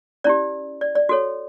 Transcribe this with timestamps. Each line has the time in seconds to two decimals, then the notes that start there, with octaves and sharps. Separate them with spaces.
0.24 C#4 E4 G4 D5
0.81 D5
0.95 D5
1.09 F#4 A4 C#5